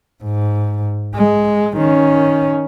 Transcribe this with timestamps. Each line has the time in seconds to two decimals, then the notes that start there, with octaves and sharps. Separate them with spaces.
0.24 G#2
1.15 G#3
1.78 D#3 C#4